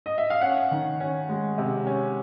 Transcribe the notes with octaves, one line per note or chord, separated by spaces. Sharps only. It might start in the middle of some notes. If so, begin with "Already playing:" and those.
D#5
E5
F5
C#4 F#5
D#3
C#4
G#3
C3
C#4